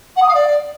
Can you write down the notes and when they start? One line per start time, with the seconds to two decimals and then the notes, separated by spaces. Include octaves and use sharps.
0.15 F#5
0.22 D#6
0.28 F5
0.34 D5